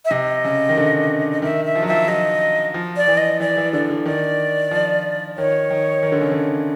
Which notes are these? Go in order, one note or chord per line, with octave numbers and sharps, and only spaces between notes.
E5
C3 D#5
C#3
D#3
D3
D#5
D#3 E5
E5
F3
F#3
F3 E5
F#3 D#5
F3
D5
E3
D#5
E3 D5
E3
D3 D5
D3
D#3 D5
F3
D#3 C#5
D#3
D#3
D3
C#3
D3